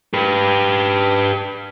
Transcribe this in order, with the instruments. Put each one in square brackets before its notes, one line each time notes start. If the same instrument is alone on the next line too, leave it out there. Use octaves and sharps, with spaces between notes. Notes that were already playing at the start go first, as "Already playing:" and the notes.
[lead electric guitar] G4 B4